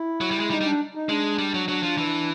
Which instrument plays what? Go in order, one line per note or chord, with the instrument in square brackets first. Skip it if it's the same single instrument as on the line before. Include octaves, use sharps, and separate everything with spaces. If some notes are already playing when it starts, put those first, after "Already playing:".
Already playing: [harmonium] E4
[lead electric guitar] F#3
G3
G#3
[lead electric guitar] G3 [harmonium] D#4
[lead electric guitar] G3
[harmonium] D4
D#4
[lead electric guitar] G#3 [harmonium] D4
[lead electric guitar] G3
F#3
[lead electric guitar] F#3 [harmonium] D4
[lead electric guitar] F3
E3